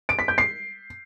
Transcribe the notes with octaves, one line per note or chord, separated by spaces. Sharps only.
D7
B6
G6
C7